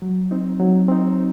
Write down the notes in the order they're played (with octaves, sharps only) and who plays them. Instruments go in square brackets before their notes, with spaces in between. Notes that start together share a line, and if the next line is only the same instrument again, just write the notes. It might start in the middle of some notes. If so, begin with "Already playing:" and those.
[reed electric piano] F#3
C4 D#4
F#3
C4 D#4